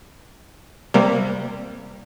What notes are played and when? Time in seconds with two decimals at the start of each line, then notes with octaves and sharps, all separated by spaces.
0.94 C3 G3 A#3